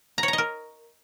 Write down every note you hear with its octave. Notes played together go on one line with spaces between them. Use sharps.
A#5
C#5
A#5
D#5
A#4